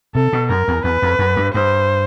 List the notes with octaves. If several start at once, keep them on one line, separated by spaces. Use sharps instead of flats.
C3 A4
B2
F#2 A#4
E2
E2 B4
F2
F#2
G2
G2 C5